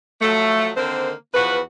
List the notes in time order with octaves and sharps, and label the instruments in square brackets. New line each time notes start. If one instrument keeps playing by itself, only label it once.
[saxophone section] F3 F#3 A3
D3 D#3 A#3 C4 C5
E2 F3 F#4 B4